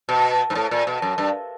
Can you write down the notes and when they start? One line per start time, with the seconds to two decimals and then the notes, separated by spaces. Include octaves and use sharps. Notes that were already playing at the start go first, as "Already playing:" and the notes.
0.09 B2
0.50 G#2
0.55 A2
0.71 A#2
0.87 B2
1.02 F#2
1.18 G2